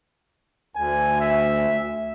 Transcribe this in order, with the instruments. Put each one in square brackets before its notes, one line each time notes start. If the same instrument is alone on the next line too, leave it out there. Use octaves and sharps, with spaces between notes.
[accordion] D2 [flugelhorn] G#5
[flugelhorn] E5